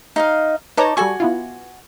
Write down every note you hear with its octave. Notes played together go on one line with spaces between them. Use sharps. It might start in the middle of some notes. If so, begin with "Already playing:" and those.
D#4 D#5 F5
D#4 B4 C#5 A5 A#5 D6
G3 F#4 A4 G#5 C#6
B3 E4 F4